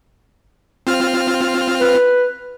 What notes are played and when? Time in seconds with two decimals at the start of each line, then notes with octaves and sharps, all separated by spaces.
0.87 C4 F4 F6
1.80 B4